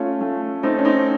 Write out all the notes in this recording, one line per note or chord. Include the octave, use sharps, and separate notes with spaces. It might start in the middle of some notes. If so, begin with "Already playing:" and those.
Already playing: A3 C#4 F4
A3
A3 C4 D#4
C#4
C4 D#4